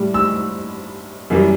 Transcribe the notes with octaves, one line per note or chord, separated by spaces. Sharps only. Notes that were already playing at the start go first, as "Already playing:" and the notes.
Already playing: A2 G3
E6
F#2 E3 G3